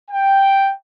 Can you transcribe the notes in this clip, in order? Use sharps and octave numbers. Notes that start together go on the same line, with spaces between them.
G5